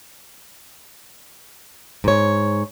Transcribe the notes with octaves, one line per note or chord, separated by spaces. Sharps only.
G#2 C#5